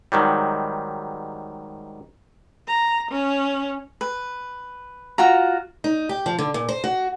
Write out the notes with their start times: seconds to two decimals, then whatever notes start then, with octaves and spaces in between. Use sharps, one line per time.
0.12 G#2 D#3 F#3 G3
2.68 A#5
3.11 C#4
4.01 B4
5.18 F4 F#4 A#5
5.84 D#4
6.09 G4
6.26 F3
6.39 D3
6.54 A#2
6.69 C5
6.84 F#4